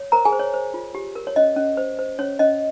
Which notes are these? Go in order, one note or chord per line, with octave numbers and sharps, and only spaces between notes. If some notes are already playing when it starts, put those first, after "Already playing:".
Already playing: C#5
A#4 C5 A#5
G#4 G#5
C5
C#5
C5
F4
G4
A#4
C#5
C#4 D#5
C#4
C5
C5
C#4 C#5
C#4 D#5